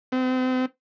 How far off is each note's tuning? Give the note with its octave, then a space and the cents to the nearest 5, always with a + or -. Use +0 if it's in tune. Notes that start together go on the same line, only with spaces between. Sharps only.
C4 -35